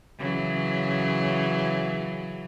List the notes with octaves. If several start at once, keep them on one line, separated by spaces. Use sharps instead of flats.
C#3 E3 F#3